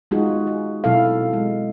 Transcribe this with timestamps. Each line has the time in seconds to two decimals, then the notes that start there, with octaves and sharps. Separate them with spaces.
0.11 G#3 B3 D#4 F4 F#4 G#4
0.47 G#4
0.84 B2 F#3 C4 E4 A4 F5
1.33 G#3